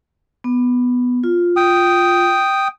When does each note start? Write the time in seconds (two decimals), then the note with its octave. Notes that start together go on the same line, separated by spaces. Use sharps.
0.44 B3
1.24 F4
1.56 G5 D#6